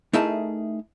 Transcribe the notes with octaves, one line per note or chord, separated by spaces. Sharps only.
A3 D#4 E4 G#4 A#4 A5